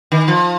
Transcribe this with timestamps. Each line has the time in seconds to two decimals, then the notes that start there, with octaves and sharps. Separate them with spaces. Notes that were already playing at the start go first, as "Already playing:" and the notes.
0.12 D#3
0.28 F3